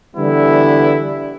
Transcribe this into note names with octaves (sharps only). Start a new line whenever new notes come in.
D3 E3 G3 B3 E4